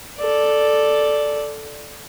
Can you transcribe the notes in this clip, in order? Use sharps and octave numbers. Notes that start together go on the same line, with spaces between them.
A4 D5